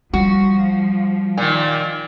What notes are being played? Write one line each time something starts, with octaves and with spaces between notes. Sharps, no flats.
F3 G3 F#4
A#2 D#3 G#5